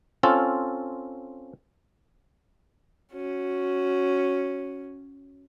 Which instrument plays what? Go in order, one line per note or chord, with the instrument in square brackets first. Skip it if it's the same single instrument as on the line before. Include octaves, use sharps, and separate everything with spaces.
[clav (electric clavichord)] C4 C#4 F4 A4
[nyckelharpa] C#4 F#4